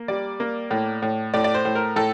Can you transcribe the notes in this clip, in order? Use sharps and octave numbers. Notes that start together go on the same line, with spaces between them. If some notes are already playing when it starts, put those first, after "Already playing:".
Already playing: A#3
G3 D5
A#3
A2
A2
A2 D5
D5
C5
A2
A#4
A2 A4